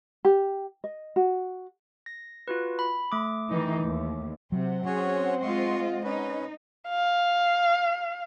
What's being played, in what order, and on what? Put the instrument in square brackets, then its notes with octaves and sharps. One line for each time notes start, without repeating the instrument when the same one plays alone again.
[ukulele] G4
D#5
F#4
[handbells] A#6
F4 F#4 B4
B5
A3 D6
[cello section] D#3 E3 D#4
D#2
[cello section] C3 [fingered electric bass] F#3 [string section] C4 C5 F#5
[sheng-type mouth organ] C#4 F#4 C#5 [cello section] G#4
[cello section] G#3 F4 D#5 [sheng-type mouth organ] C6 C#6
[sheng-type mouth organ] C#4 B4 [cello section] D#4
[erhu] F5